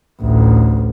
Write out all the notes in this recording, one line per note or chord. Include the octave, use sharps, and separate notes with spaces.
A1 D2